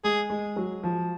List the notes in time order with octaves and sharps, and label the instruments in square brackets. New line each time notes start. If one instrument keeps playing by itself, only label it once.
[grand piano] G#3 [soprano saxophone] G#4
[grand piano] G#3
F#3
F3